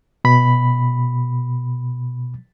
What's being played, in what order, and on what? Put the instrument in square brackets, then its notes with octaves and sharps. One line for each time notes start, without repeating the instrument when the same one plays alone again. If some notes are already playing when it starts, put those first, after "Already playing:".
[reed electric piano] B2 B5